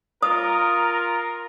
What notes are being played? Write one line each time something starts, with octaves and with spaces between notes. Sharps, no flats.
F4 A#4 D#6